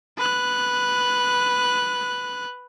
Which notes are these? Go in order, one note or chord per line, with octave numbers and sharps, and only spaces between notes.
B4 F#6